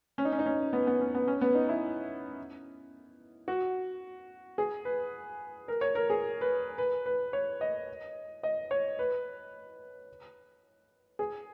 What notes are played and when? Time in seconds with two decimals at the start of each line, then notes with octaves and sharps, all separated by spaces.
0.18 C#4
0.25 D#4
0.32 C#4
0.39 D#4
0.46 C#4
0.73 B3
0.87 B3
1.01 C#4
1.15 B3
1.28 C#4
1.41 B3
1.55 D#4
1.69 E4
3.48 F#4
4.58 G#4
4.85 B4
5.68 A#4
5.81 C#5
5.95 A#4
6.10 G#4
6.41 B4
6.78 B4
7.06 B4
7.33 C#5
7.61 D#5
8.43 D#5
8.71 C#5
8.99 B4
11.19 G#4